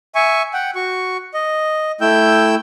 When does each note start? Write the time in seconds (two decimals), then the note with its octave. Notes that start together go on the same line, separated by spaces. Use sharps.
0.15 E5 G#5 C#6
0.53 F#5 G5
0.75 F#4 C#6
1.34 D#5
2.01 A3 E4 G5 E6 G6